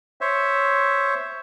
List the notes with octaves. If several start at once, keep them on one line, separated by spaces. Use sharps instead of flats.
C5 C#5 E5